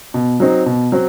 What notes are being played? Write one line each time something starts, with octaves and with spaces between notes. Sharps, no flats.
B2
F#3 C4 D#4
B2
F#3 C4